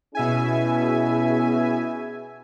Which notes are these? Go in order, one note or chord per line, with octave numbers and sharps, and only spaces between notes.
B2 C#4 E4 G#4 E5 G#5